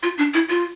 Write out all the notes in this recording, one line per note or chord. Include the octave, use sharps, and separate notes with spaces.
F4
D4
E4
F4